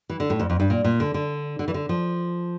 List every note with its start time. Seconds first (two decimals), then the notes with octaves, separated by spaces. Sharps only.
0.09 E3
0.20 D3
0.30 A2
0.39 F2
0.50 F2
0.60 G2
0.70 A#2
0.84 A#2
1.00 D3
1.14 D3
1.59 D3
1.68 E3
1.74 D3
1.89 F3